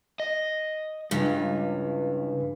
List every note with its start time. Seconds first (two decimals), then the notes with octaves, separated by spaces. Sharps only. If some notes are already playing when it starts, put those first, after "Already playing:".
0.20 D#5
1.11 C#2 G2 E3